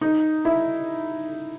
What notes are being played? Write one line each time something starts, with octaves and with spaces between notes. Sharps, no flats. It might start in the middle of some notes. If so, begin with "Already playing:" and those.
D#4
E4